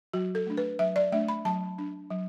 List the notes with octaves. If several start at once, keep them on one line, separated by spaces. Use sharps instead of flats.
F#3 F#4
A4
A3 D4
B4
F#3 E5
D5
A3 D4 E5
B5
F#3 A5
D4
F#3